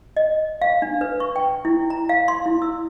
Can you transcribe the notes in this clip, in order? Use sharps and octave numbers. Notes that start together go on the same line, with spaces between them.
D#5
F5
D4
B4
C#6
G5
E4
A#5
F5
C6
E4
E6